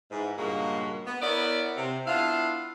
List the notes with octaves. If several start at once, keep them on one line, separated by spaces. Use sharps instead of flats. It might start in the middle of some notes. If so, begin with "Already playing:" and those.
G#2 E3
G2 A#2 C#3 G#3 A#3 F#4
B3
B3 E4 A#4 C#5 D5
C3
B3 D4 E4 F4 F5